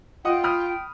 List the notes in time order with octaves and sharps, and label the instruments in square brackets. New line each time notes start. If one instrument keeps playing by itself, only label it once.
[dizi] F4 [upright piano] D#5 F#5 D#6 [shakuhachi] G5
[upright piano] B5 D#6 F6